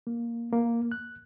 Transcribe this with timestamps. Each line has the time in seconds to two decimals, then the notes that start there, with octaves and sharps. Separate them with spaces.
0.07 A#3
0.53 A#3
0.92 F#6